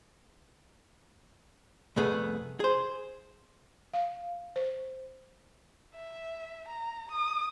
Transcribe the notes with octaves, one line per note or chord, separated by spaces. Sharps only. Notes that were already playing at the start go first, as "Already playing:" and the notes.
C2 F2 A3 B3 G#4
G#4 C5
F5
C5
E5
A#5
D#6